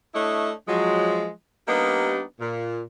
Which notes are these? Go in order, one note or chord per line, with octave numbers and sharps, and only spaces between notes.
A3 D4 E4 C#5 D#5
F3 F#3 G#3
G3 A#3 B3 D4 D#4 G4
A#2